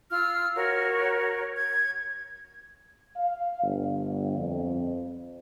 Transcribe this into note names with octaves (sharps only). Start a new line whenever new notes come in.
F4 E6 F6
F#4 A#4 C#5
G#6
F5
G1
F2